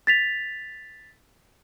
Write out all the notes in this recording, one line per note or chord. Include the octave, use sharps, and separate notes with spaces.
A6 B6 F7